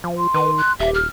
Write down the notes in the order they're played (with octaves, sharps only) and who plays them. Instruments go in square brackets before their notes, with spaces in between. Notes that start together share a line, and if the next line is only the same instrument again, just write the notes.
[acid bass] F3
[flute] C6
[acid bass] D#3 [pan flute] B4
[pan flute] F#6
[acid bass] D#1 [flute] G4 [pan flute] E5
[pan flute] F6